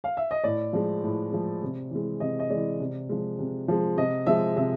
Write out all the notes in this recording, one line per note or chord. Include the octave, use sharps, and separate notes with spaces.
F5
E5
D#5
A2 D5
F3 G#3
A2
F3 G#3
C3
E3 G#3
C3 D#5
D#5
E3 G#3 D5
C3
F3 G#3
C3
F3 G#3
C3 D#5
F3 G#3 E5
C3 E5